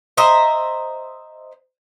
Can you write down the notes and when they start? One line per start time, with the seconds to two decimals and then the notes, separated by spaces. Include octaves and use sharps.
0.17 C5 D#5 E5 A#5